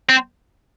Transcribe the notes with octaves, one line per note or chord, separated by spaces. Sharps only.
C4